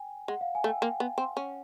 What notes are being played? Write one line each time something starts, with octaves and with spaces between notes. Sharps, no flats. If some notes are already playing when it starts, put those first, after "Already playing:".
Already playing: G5 G#5
G#3 F#5
F5
G#5
A3
G5
A#3 G5
B3
C4
C#4 F#5